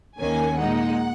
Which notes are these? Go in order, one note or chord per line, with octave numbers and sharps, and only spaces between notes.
D#2 D#3 A#3 C#4 G#5
A#2 G#3 D#4 F#5